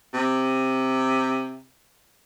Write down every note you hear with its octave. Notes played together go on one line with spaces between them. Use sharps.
C3